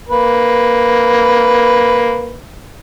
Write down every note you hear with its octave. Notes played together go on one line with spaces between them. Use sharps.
A#3 B4